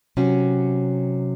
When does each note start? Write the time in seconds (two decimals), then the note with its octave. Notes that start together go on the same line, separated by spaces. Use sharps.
0.17 C3 F#3 C#4 F#4